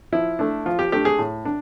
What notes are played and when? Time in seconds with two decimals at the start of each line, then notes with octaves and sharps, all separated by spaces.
0.12 F3 E4
0.39 A3 D4
0.66 F3 F4
0.79 G4
0.92 A3 D4 G4
1.05 G#4
1.19 A2
1.45 D4